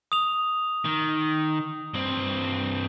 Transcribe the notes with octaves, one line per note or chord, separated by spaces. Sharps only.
D#6 F7
D#3
G2 C4